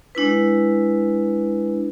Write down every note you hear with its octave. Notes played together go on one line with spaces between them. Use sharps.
G#3 D4 E4 B4